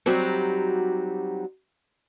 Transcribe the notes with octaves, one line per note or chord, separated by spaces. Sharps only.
F#3 G3 C4 D#4 F#4 G4